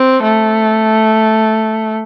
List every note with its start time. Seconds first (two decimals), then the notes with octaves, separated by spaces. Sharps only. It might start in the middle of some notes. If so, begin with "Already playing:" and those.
Already playing: C4
0.24 A3